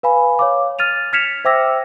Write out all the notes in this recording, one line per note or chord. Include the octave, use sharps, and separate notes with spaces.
B4 F5 G#5 B5
C#5 F5 D6
F6 A6 D#7 F7
F6 G#6 B6 C#7 E7 F7
C5 E5 G5 D6 E6 A#6